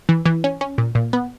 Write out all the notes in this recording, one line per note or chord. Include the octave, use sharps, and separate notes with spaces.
E3
E3
C#4
C#4
A#2
A#2
B3